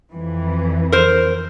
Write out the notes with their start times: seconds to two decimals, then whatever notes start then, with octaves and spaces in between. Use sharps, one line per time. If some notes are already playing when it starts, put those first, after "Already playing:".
0.11 F2 E3
0.92 A#4 C5